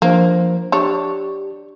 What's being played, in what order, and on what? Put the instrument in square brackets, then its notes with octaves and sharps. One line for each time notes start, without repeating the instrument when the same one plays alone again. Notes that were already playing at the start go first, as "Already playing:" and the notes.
[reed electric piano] F3 D4 C5 [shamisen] A#3
[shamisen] D4 C#5 [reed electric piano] G4